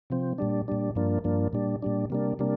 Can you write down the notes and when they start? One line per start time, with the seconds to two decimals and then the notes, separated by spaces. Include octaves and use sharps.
0.10 C3 F3 C4
0.38 A#2 G3 D4
0.68 A#2 G3 D4
0.95 G2 F3 A#3 D4
1.24 G2 F3 A#3 D4
1.53 A#2 G3 D4
1.82 A#2 G3 D4
2.10 C3 G3 A#3 D4
2.39 C3 G3 A#3 D4